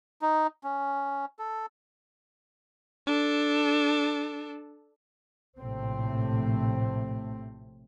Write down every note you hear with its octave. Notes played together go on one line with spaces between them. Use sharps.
D#4
C#4
A4
D4 A4
A#1 A2 C3 A3 C4